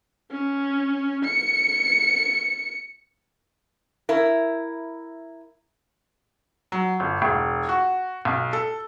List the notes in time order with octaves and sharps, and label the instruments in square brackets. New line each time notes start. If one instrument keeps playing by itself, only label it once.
[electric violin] C#4
C#7
[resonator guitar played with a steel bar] E4 A#4
[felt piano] F#3
G1
E1
F#4
B1
A4